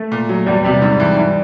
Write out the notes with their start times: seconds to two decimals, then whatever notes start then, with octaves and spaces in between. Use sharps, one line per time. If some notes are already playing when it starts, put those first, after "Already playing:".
Already playing: A3
0.12 A#2
0.29 F#3
0.46 E2 G3
0.64 C3 G3
0.82 G#2
1.00 E3
1.18 E3